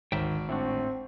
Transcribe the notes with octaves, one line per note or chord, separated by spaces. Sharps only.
G#1 D2 G#2 D#3 E5 G5
A2 C4 D4 E5 F#5 C#6